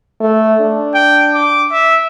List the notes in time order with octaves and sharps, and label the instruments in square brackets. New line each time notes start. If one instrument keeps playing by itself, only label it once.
[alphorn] A3
D4
[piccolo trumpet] G5
D6
E5